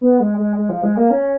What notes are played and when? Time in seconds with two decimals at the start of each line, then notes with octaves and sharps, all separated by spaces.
0.01 B3
0.20 G#3
0.38 G#3
0.57 G#3
0.69 F3
0.83 G#3
0.97 A#3
1.10 C#4